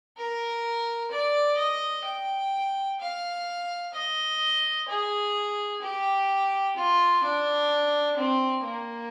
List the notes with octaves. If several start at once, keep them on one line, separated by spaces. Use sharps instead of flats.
A#4
D5
D#5
G5
F5
D#5
G#4
G4
F4
D4
C4
A#3